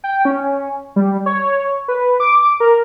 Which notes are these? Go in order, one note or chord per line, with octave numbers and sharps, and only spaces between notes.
G5
C#4
G3
C#5
B4
D6
A#4